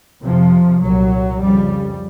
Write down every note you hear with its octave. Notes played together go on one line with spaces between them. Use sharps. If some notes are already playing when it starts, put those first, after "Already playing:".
F2 C3 F3
C2 A#2 F#3
F2 C#3 G3